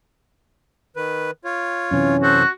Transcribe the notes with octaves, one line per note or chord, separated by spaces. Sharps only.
D#3 B4
F4 C#5
F#2 C3 E3 C#4
F#4 A4 C5